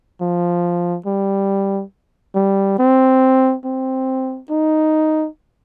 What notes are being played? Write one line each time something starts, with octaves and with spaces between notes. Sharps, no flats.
F3
G3
G3
C4
C4
D#4